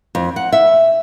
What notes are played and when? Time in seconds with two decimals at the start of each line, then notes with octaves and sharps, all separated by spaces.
0.15 F2
0.36 F#5
0.53 E5